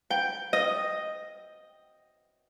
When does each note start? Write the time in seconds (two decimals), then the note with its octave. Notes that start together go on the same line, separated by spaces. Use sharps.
0.10 G5
0.53 D#5